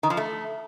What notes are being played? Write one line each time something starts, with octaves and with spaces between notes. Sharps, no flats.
D#3
F3
A3